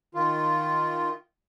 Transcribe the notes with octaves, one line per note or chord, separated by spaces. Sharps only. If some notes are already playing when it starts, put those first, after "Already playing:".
D#3 F4